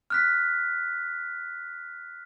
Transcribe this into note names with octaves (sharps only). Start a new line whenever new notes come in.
F6 F#6 B6